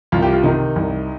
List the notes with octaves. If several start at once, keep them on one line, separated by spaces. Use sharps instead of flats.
C2 F4
G4
F4
C3 D#3 D#4
C2